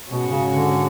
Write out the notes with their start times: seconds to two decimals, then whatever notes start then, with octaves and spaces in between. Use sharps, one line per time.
0.10 G#2 B2 G#3 C#4 F#4
0.30 C#3
0.49 D3